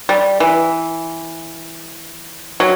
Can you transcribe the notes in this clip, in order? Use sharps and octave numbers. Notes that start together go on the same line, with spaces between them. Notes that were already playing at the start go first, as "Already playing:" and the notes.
G3
E3
F#3